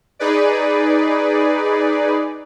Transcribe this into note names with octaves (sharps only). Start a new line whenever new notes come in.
D#4 G#4 B4 D5